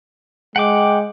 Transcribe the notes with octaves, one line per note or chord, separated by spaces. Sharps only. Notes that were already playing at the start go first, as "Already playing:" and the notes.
G#3 F#5 G5 D6